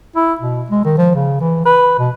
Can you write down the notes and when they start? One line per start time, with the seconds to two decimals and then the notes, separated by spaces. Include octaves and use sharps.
0.16 E4
0.40 B2
0.70 G#3
0.85 D#3
0.98 F3
1.15 C#3
1.41 E3
1.65 B4
1.99 B2